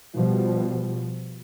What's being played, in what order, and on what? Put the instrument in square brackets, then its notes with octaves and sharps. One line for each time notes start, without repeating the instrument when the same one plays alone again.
[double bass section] B2 F3 G3